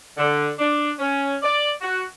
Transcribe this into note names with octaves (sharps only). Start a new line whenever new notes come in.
D3
D4
C#4
D5
F#4